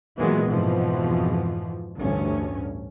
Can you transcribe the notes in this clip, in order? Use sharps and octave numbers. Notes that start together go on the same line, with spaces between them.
A#2 D#3 E3 F#3 G#3 B3
F2 G#2 B2 E3 F3
A1 D2 G2 C#4